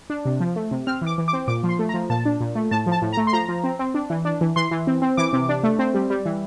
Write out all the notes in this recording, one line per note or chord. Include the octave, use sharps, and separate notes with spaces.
D4
C3
F3
A3
C3
C4 F6
E3 D6
E3
D6
C4
A#2 D6
F3
C6
A3
A#5
F3
A#2 A5
D4
A#2
A3
A2 A5
F3
A5
A2
A#5
A3
C6
F3 A#5
F3
C4
C4
D4
E3
D4
E3
E3 C6
E3
C4
C4
E3 D6
C3
D4
A3
C4
G3
G3
E3